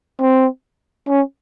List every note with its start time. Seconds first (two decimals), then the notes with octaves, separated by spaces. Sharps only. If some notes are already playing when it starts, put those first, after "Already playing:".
0.20 C4
1.08 C#4